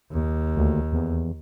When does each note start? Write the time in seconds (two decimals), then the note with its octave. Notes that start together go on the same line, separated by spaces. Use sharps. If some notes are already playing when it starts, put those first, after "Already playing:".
0.12 D#2
0.56 D2
0.93 E2